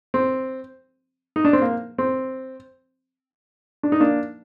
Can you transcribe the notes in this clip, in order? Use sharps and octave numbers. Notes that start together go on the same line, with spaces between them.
C4
D#4
D4
C4
A#3
C4
D4
D#4
A#3 D4